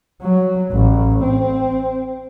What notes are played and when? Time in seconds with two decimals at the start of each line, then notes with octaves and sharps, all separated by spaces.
0.21 F#3
0.72 A1
1.24 C4